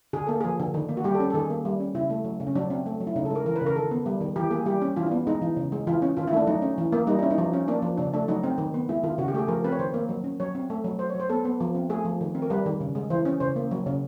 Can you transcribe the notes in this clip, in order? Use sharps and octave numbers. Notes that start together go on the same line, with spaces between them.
D3 G#4
A#3 A4
F3 G#4
D3
D#3
A#3
F#4
G3 G4
A4
C#4
A4
D#3 G#4
A#3
G3
C#4
C#3 E4
A3
F#3
C#3
C#4
F#3 D4
C4
A3
F#3
E4
C#3 D#4
A4
G#3 A#4
E3 A#4
B4
C#3
A#4
D#3 A4
B3
G3
D#3
E3 G4
A#3 G#4
G3 G4
C#4
E3 F4
D4
B3
G#3 D#4
E3
C#3
G#3
E3 F4
C#4
D#3 F4
E4
A3 D4
F#3 D#4
C#4
E3
A#3
G3 D#4
C#4 E4
D#4
F3
C#4
A#3 D4
F3
C#3 D4
A3 D4
F#3 D#4
C4
D#3
B3
G#3 E4
D#3 F4
C#3 F#4
G4
A3 G#4
F3 A#4
C4 B4
C#5
D#3 C5
A#3
F#3
C#4
F#3 C#5
C4
A3
F#3
F#3 C5
F#3 C#5
C5
B3 A4
B3
F3
C4
A3 G#4
F3
D#3
C4
A#4
G3 B4
D#3
C#3
G#3
E3 C5
C#4
C#3 C5
A#3
F#3
C#3